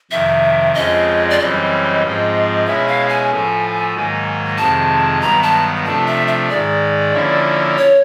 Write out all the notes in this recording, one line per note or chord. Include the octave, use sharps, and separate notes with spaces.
F2 C3 D#3 E5
F2 C#3 F3 G#3 C4 D#5
D5
F#2 C#3 E3 G3 C4 D#5
G#2 F3 G#3 C4
B2 G#3 C#4 E4 E5
F5
G#5
A2 F3 A3
G#2 D#3 F#3 A#3 D#4
F2 C3 D#3 G#3 A5
G2 D#3 F#3 B3 A#5
A5
C3 F3 A3 D4 A5
E5
E5
G#2 D#3 G#3 D5
D3 F3 A#3 C#4 E4
C#5